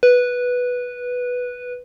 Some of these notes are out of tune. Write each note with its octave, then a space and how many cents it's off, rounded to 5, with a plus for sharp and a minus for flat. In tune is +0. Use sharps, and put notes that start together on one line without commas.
B4 -5